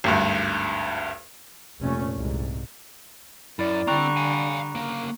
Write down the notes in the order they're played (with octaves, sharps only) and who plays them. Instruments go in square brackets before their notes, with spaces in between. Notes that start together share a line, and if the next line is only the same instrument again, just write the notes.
[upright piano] G#1 D2 G2
[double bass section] F1 A#2 A3 C#4
C2 G#2
[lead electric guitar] F#2 [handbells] E4 D5
[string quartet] D3 G3 [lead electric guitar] C4 [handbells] A#5 C#6 F#6
[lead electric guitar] F5 G#5
C#3 A#3